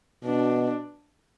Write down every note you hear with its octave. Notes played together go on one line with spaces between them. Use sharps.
B2 D4